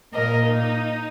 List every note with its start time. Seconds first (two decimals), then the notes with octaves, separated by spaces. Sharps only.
0.13 A#2 A#3 A#4 D#5
0.47 D#4